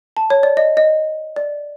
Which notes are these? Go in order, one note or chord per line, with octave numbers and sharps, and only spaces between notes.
A5
C#5
D5
D#5
D#5
D5